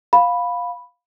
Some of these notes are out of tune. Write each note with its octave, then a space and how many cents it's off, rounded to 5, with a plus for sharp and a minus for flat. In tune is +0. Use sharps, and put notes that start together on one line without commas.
F5 +15 B5 +0